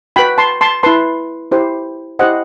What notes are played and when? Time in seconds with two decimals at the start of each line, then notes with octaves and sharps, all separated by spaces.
0.16 F#4 B4 G5 B5
0.38 A5 C6
0.61 A5 C6
0.83 E4 B4 A5 C6
1.52 E4 G4 C5
2.19 E4 G4 C5 D#5 F#5